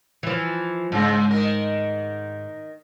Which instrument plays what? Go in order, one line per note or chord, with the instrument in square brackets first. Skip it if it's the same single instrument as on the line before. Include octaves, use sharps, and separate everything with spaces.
[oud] E3 F3
[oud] G#2 [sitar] C#3 C4
[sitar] D#3 A#4